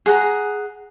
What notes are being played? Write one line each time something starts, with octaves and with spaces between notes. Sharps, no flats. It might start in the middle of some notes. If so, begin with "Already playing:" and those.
G#4 F#5 A#5